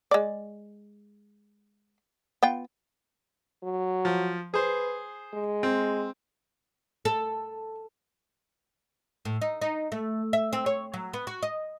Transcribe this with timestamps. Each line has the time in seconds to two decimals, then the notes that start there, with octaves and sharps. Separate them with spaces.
0.11 G#3 D5
2.43 B3 F4 G5
3.63 F#3
4.05 F3
4.54 G#4 B4 C5
5.34 G#3
5.63 C4
7.05 A4
9.25 A2
9.41 D#4
9.61 D#4
9.92 A3
10.33 E5
10.53 C4
10.66 C#5
10.94 F#3
11.13 B3
11.27 F#4
11.43 D#5